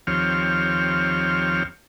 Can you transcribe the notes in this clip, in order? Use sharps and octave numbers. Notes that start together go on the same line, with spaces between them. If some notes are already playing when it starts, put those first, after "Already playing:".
D#2 F3 C4 G4 C#5 F6